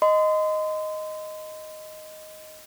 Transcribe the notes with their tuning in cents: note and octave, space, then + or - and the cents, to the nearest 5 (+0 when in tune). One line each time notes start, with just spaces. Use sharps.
D#5 +0 C6 -35